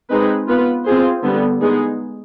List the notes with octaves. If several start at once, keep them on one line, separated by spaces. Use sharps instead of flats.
G#3 C4 D#4 G#4 B4
B3 F4 B4
C4 F4 G#4 C5
D3 G3 B3
G#3 B3 D#4 G#4